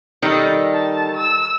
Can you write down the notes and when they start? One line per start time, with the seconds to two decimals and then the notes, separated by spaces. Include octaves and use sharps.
0.22 D#3 G3 D#4 A4
0.74 A5
1.17 E6